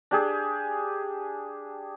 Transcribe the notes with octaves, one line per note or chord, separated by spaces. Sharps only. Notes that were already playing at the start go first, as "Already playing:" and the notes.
D4 G4 G#4